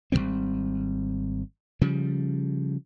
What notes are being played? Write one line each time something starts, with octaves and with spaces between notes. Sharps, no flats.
G#1 G#2 G3 C4
C#3 F3 G3